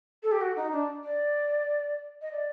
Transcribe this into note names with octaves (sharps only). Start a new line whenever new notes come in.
A4
G4
F#4
D#4
D4
D5
D#5
D5